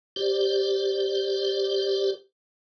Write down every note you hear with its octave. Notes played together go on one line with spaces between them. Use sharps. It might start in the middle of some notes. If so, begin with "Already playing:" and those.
G4 C5 D5